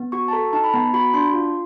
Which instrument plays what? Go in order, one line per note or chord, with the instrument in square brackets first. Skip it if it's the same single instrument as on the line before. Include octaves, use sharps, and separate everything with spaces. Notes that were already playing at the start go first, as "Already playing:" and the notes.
Already playing: [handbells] B3
F#4 C#6
A5
A4 A#5
D#4 A5
B5
B3 A#5
F#4 B5
D4 C6
F4